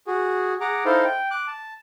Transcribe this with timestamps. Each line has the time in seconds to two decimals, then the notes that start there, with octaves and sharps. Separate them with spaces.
0.07 F#4 G#4
0.61 G#4 F#5 A#5 D6
0.85 D#4 E4 A4 C5 F5
1.04 G5
1.31 D6 F#6
1.47 A5